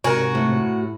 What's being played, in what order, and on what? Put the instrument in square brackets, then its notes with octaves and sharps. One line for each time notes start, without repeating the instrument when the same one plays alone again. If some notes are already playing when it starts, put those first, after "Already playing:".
[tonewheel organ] G#2 C3 [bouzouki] F#4 [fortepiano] A#4 G#5
[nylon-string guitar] A2